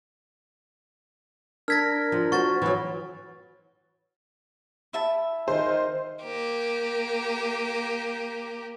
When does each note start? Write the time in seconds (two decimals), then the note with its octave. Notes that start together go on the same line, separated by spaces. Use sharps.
1.68 D4 A#4 F6 G#6 A#6 B6
2.12 F3
2.32 F#4 C5 C#6 A6
2.62 E3 F#3
4.93 E4 E5 A5
5.48 D#3 C5
6.22 A#3 G4